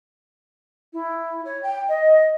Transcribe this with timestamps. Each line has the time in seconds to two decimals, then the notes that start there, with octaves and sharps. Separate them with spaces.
0.93 E4
1.45 C#5
1.62 G5
1.88 D#5